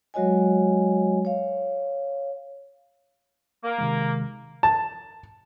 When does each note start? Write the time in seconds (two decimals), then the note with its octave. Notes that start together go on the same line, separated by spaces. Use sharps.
0.14 F#3 G#3 F#4 C#5 D#5 G#5
1.25 C#5 F5
3.64 A#3
3.78 C3 D#3 G#3
4.63 A5